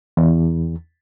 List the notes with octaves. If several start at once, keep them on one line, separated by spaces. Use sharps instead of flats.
E2